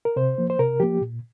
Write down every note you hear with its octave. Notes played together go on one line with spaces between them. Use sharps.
A#4
C3 C5
F3 A#3
C5
C3 A#4
F3 A#3 G4
A#2